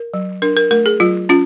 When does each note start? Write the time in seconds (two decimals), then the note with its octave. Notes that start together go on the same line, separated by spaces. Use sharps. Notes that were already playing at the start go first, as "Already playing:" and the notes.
Already playing: A#4
0.14 F#3
0.42 D4 A#4
0.57 A#4
0.71 A3 A#4
0.86 G#4
1.00 F#3 F4
1.29 C#4 F4